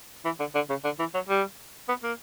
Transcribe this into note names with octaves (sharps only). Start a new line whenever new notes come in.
E3
D3
D3
C#3
D3
E3
F#3
G3
B3
A#3